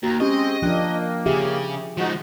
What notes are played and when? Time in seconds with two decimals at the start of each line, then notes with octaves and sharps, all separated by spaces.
0.03 D#2 F#4 A#5
0.20 G#3 C4 C#4 G4 D#5 C#6
0.62 F3 A#3 D4 G5 F#6
1.26 C#3 G4 G#4 E5
1.97 F3 G#3 D#4 F#4